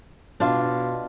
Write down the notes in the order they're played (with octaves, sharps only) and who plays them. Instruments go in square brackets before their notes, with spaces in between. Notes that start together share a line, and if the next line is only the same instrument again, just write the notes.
[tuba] B2 [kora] D4 F4